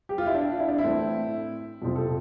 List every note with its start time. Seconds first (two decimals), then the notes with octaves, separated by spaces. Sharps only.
0.09 G4
0.18 F4
0.26 E4
0.35 D4
0.59 E4
0.69 D4
0.78 E4
0.84 A2 E3 A3 C4
1.82 F2 C3 F3 C4
1.96 A4